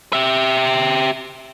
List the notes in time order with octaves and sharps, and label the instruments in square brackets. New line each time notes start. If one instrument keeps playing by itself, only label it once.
[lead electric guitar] G4 E5